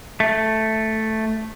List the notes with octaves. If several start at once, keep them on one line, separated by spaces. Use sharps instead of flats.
A3